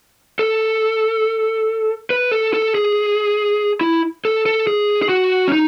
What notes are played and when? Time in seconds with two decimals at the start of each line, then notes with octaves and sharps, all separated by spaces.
0.39 A4
2.10 B4
2.32 A4
2.54 A4
2.75 G#4
3.81 E4
4.25 A4
4.46 A4
4.67 G#4
5.02 G#4
5.09 F#4
5.48 C#4
5.52 D#4